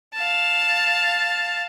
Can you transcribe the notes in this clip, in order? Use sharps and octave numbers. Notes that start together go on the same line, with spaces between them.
F5 A5